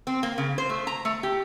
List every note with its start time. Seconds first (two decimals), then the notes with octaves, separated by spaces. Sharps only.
0.07 C4
0.23 A#3
0.38 C#3
0.58 C5
0.70 A3
0.87 A#5
1.05 A3
1.23 G4